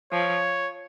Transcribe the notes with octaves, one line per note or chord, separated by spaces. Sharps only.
F3 C#5